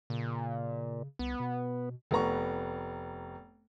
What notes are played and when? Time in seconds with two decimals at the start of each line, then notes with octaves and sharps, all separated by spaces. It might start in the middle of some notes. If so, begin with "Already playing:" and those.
0.10 A#2 C#3
1.19 C2 B3
1.40 B2
2.11 F1 B3 A#5 C#6